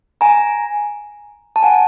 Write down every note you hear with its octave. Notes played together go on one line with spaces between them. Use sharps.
G#5 A#5
A5
F#5 G#5
G#5